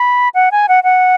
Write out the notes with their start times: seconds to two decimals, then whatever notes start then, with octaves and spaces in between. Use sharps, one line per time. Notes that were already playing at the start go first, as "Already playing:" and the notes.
Already playing: B5
0.34 F#5
0.52 G#5
0.68 F#5
0.84 F#5